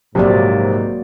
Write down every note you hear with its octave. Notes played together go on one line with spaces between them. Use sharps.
A#1 G#2 C3 F#3 A#3 D5